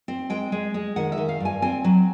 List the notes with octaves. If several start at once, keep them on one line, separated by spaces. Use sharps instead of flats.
C4
G#3 G5
G#3
G#3
D#3 F#5
E5
D#3
F5
G2 G#5
C4 G#5
F#3